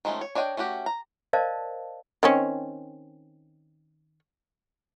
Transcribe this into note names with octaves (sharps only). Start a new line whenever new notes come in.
D#3 F3 G#3 A3 C#4
C#5
D4 C#5 D#5 F#5 G5
A3 C#4 F#4 G4
A#5
A#4 C5 D5 D#5 F5 A5
D#3 C4 C#4